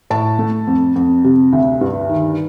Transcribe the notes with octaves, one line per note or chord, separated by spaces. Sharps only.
A2 A5
A3
F2
F2
C3
D2
G2
D#3